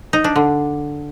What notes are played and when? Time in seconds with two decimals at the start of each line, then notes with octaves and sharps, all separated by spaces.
0.13 D#4
0.24 D4
0.36 D3